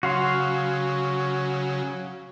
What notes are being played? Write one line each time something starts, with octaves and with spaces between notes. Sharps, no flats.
C#3 F#3 F#4 F5 C6